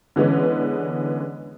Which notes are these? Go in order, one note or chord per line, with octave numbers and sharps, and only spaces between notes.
D3 E3 G#3 B3 C#4